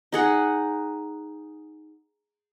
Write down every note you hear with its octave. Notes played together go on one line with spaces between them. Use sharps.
D#4 G#4 F#5